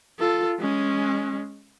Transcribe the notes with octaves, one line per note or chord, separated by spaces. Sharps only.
F4 A4
G#3 C#4